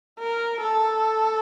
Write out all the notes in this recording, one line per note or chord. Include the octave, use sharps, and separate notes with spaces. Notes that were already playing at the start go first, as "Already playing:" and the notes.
A#4
A4